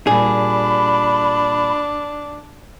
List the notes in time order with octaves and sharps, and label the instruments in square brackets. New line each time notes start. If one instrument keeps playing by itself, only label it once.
[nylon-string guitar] A#2 G3 [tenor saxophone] D4 [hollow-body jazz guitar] G#4 [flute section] B5